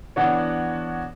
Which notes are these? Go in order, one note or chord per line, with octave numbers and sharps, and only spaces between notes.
E3 B3 D4 F#4 C#5